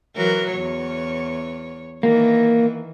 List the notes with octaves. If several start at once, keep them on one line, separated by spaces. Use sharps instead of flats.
E3 F#3 A#4
E2 C#5
D#3 E3 A#3